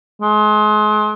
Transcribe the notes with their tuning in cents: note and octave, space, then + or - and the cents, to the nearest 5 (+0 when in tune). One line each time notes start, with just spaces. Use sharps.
G#3 +35